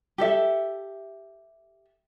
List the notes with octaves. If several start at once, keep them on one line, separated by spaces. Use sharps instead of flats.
G4 A4 E5